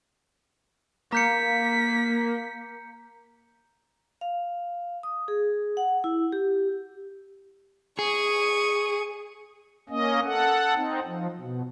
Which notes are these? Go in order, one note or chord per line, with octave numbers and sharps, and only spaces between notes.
A#3 A#5 G6 B6 C#7
F5
D#6
G#4
F#5
E4
G4
G#4 C#6 D#7
A#3 C#4 D#5
A4 F#5
C4 D#4
F3
B2